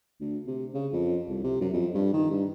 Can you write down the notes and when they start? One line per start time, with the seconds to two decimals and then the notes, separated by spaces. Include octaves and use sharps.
0.21 D2
0.47 C3
0.74 C#3
0.93 F2
1.29 C2
1.44 C3
1.61 F#2
1.74 F2
1.95 G2
2.13 D#3
2.31 G2